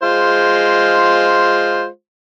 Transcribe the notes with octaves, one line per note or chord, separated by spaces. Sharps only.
G#3 F4 C5